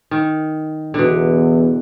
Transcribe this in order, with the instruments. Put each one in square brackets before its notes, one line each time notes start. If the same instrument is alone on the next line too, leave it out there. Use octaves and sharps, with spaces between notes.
[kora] D#3
[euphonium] E2 [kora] B2 D3